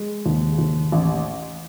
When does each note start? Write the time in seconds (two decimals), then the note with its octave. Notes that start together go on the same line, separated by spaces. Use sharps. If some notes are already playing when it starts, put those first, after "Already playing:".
Already playing: G#3
0.26 D#2
0.58 D#2
0.92 A1